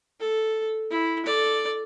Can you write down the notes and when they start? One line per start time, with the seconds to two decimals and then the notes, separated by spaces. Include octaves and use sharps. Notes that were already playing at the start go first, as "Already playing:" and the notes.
0.20 A4
0.90 E4
1.25 A4 D5